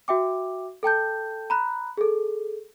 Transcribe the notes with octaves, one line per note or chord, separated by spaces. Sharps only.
F#4 E5 G5 D6
A4 G5 A5 G6
A#5 B5 F#6
G#4 A4